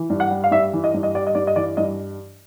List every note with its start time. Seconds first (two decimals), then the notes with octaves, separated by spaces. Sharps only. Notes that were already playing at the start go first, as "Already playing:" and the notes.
Already playing: E3
0.10 G2
0.20 F#5
0.31 G3
0.44 F5
0.51 G2 E5
0.73 E3
0.84 D#5
0.94 G2
1.03 D#5
1.15 G3 D5
1.27 D#5
1.35 G2 D5
1.47 D#5
1.56 E3 D5
1.77 G2 D#5